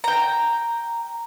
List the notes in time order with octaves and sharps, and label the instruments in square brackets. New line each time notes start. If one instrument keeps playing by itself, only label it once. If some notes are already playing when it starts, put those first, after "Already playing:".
[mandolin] G5 A#5